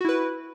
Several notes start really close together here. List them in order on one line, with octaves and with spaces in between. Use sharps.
F#4 E4 B4